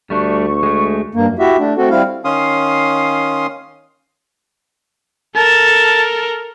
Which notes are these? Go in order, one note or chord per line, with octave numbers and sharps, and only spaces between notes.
D2 G3 A3 D4 C#6
G#3 A3
G2 A#3
F#2
E4 F#4 G4 E5
A3 D4
A3 C4 F#4 A4
G3 C4 E4 F5
D#3 C#4 F5 C6 D#6
A4 A#4 A5